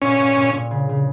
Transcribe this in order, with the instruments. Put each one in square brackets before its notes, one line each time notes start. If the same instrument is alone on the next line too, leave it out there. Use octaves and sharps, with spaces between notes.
[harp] A#2 [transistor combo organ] C#4
[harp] A#2
A#2
A#2
C#3
C#3